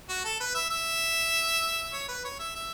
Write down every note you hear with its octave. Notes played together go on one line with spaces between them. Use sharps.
F#4
A4
B4
E5
E5
C#5
B4
C#5
E5
E5